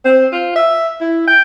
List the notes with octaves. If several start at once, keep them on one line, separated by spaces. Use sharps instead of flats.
C4
F4
E5
E4
G5